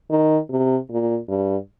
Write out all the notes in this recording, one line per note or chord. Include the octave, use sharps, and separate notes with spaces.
D#3
C3
A#2
G2